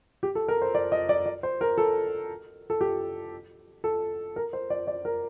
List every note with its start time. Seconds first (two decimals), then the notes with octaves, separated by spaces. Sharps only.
0.23 G4
0.35 A4
0.48 A#4
0.62 C5
0.75 D5
0.92 D#5
1.09 D5
1.26 D5
1.43 C5
1.61 A#4
1.78 A4
2.70 A4
2.81 G4
3.84 A4
4.36 A#4
4.53 C5
4.70 D5
4.87 D5
5.05 A#4